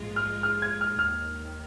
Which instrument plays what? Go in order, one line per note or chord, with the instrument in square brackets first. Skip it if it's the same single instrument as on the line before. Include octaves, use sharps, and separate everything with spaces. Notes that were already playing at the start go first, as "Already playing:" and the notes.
Already playing: [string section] A#1 G#2 G#3 F4
[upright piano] F6
F6
G#6
F6
[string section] D#2 D#3 [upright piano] F6